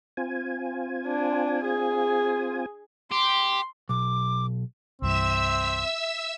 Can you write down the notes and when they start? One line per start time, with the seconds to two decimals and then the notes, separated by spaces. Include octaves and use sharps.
0.17 C4 F4 G#5
1.07 D4
1.64 G#4
3.12 G4 C6
3.89 B1 D6
5.02 C2 G2 E3 C4 E5 E6